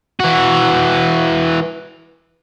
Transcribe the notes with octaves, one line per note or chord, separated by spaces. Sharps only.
E3 F#4